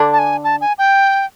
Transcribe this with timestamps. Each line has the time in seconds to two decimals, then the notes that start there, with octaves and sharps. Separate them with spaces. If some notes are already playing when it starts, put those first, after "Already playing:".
Already playing: D3 D4
0.13 A5
0.19 G#5
0.44 A5
0.61 G#5
0.78 G5